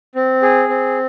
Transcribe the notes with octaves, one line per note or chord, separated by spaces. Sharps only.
C4
G#4
C4